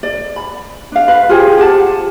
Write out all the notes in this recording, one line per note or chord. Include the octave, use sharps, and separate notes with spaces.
D5
B5
D4 F5
B4
F4 G4 G#4 C5
G4 F#5 A5